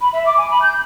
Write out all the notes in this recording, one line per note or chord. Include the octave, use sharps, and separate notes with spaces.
B5
E5
D6
G#5
B5
G6